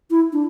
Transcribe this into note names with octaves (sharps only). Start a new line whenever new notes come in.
E4
D4